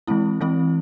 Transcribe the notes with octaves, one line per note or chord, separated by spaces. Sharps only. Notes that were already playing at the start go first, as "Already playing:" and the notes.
E3 G#3 C4 E4
E3 G#3 C4 E4